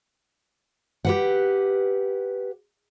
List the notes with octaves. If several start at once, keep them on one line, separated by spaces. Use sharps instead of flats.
G4 B4 F#5